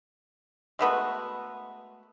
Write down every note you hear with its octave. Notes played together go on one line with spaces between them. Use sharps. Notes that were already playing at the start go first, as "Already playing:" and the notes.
G#3 A3 B3 F#4